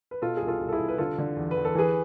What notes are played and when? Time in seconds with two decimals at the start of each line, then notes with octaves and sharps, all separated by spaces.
0.11 B4
0.22 B2 F4 A4
0.37 C2 G#4
0.47 F4 A4
0.60 C2
0.69 A4
0.73 E4 G#4
0.80 C2
0.88 B4
0.98 D3 F4 A4
1.18 D3
1.36 E2
1.51 B4
1.57 E2
1.65 A4
1.75 E3 G#4 B4